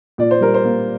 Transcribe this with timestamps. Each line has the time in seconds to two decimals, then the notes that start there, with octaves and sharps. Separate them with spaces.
0.18 A#2 D5
0.31 C5
0.41 G3 A#4
0.54 C5
0.64 A#3